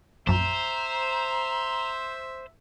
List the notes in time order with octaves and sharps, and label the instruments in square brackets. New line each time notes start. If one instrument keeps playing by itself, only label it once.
[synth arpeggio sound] A#1 F#2 [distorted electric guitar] C5 [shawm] E5 [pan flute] A#5